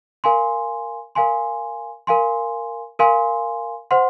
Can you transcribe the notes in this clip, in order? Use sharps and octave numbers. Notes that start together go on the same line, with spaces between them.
A#4 F5 G#5 C6
A#4 F5 G#5 C6
A#4 F5 G#5 C6
A#4 F5 G#5 C6
C5 F#5 C6